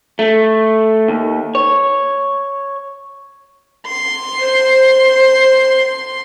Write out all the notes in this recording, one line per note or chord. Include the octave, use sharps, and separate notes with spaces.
A3
D#2
C#5
C6
C5